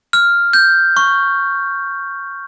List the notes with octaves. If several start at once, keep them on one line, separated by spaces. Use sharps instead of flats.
F6
G6
C#6